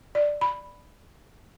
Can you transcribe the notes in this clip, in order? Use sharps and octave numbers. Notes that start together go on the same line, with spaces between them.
D5
B5